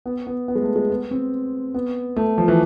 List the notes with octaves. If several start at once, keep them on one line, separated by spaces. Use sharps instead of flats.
B3
B3
B3
G#3
A3
G#3
B3
C4
B3
A3
F3
E3